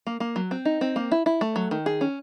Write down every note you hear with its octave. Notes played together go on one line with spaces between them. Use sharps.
A#3
A#3
F#3
C4
D#4
C4
A#3
E4
E4
A3
F#3
D#3
G#4
C#4